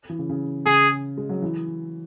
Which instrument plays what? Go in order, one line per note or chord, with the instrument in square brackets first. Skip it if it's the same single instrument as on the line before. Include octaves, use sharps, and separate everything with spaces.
[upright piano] E3
C#3
C#3
[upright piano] C#3 [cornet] G#4
[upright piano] G#3
F#3
E3